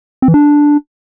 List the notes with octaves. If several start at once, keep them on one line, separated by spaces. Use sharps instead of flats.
C4
E3
D4